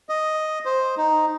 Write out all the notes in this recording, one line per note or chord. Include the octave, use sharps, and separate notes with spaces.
D#5
C5
D#4